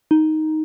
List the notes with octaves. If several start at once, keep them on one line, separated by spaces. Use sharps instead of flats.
D#4